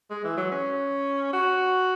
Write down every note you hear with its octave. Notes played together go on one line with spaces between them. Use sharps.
G#3
E3
F#3
C#4
F#4